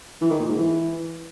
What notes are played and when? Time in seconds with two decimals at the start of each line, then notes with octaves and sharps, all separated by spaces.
0.21 E3
0.30 D#3
0.39 A#2
0.49 G#2
0.58 E3